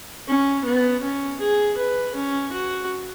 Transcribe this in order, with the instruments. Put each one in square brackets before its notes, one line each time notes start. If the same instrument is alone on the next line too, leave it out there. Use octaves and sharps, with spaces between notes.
[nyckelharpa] C#4
B3
C#4
G#4
B4
C#4
F#4